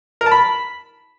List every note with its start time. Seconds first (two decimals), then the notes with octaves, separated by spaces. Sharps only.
0.21 A#4
0.26 A5
0.31 B5